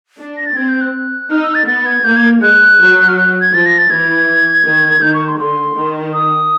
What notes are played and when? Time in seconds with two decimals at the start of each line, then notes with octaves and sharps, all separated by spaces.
0.19 D4
0.37 A#6
0.46 A6
0.56 C4 G#6
0.68 G6
0.81 F#6
1.30 D#4 F6
1.42 E6
1.54 A6
1.67 B3 A6
1.86 G#6
2.04 A#3 G6
2.16 G#6
2.42 G#3 F#6
2.79 F#3
3.08 F6
3.16 F#6
3.41 G#6
3.53 F3 A6
3.66 A#6
3.78 A6
3.90 E3 G#6
4.65 D#3
5.02 D#3 G6
5.14 C#6
5.27 C6
5.39 D3 C6
5.76 D#3
6.13 D#6